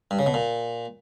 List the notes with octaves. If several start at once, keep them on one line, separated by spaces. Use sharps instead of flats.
G2
C#3
B2
A#2